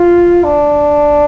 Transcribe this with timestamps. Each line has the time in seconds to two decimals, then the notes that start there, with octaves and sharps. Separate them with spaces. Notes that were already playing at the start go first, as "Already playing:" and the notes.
Already playing: F4
0.44 D4